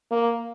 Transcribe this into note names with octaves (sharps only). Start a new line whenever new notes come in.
A#3